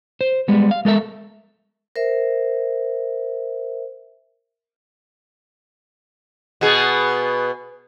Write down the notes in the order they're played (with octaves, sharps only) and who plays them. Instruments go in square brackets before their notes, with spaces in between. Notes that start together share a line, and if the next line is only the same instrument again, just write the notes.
[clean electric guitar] C5
G3 G#3 B3
F5
G#3 A4 A#4 E5
[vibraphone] A#4 C5 E5
[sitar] B2 B3 G#4